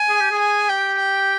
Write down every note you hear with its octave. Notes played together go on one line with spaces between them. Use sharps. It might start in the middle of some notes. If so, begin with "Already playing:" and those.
Already playing: G#5
G#4
G4
G#4
G#5
G4 G5
G5